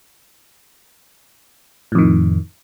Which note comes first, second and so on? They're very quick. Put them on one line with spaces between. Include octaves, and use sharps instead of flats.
A2 F2 D#3